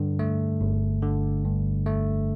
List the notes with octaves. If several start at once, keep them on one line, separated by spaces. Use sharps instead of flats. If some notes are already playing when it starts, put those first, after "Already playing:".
Already playing: G2 D3
A3
G1
D3
G2
A3